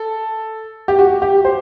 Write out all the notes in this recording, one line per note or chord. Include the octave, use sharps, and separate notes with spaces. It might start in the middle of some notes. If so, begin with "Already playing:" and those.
Already playing: A4
G4
F#4
G4
C5